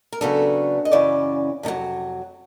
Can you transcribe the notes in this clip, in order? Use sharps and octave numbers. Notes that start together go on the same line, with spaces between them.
A#4
C#3 F#3 B3 D4 A4
D#5
F#2 C#3 E3 C#4 D5
F2 C3 D#3 F#3